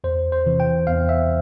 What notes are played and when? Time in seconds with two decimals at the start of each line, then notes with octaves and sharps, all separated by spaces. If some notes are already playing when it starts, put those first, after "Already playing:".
0.04 E2 C5
0.32 C5
0.46 C3 E3
0.60 G5
0.87 E2 F5
1.09 E5